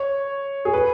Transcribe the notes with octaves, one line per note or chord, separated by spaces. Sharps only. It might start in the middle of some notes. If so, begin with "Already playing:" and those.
Already playing: C#5
G#4
B4